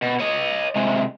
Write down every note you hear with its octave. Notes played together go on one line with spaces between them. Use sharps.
B2
C#5 D#5
C3 G#3